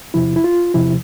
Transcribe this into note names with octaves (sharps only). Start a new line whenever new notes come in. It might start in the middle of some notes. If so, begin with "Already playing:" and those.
E2 C3 F3 E4
E4
F4
E2 C3 F3 E4